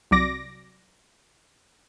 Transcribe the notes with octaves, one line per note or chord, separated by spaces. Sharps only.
C2 C3 F#3 D5 D6 A#6